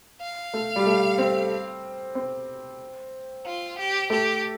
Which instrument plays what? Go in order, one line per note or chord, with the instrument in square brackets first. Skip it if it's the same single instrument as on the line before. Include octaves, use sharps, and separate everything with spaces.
[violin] F5
[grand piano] A3
G3
A3
C4
C4
[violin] F4
G4
[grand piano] A3 [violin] G4